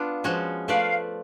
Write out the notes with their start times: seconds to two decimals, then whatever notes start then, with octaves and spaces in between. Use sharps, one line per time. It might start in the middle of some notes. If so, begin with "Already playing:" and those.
Already playing: B3 D4 F4
0.24 F3 G#3 C#4 F#4
0.68 A3 F4 B4 D5 F5